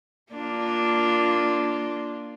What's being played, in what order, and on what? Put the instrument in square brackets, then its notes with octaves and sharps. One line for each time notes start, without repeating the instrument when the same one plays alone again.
[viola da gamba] A#3 D4 F4